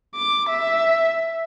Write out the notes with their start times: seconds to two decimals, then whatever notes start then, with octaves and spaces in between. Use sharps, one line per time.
0.15 D6
0.49 E5